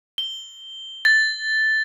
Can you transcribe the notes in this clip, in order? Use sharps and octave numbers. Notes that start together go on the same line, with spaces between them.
G7
A6